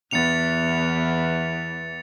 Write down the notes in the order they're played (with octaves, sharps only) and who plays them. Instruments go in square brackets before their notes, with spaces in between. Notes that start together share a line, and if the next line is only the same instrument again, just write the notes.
[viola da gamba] E2 E3 B3 [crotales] A6 C#7 F7